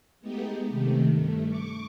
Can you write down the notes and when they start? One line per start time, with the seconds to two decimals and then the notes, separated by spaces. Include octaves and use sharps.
0.20 G#3 A3 B3 D#4 G4
0.68 C3 D#3 A3
1.12 G2 A3
1.48 C#6 D6